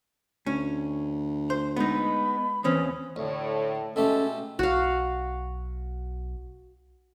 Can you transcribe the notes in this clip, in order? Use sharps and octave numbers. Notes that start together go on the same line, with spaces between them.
D2 C#4
C5
G#3 B3 D#4 B5
D#2 E3 C4 C#4 D#6
D2 A2
B2 G#3 A3 C#4 G4 A4
B1 F#4 F5